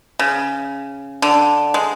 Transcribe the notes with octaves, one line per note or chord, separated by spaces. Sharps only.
C#3
D3
G#3